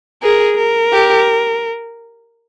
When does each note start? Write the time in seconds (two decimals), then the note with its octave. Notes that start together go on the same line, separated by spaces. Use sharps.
0.23 G#4 A#4
0.58 A#4
0.92 G4